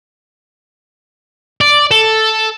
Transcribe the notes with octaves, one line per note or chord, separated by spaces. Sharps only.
D5
A4